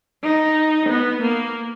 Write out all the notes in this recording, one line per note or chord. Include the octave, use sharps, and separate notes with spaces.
D#4
B3
A#3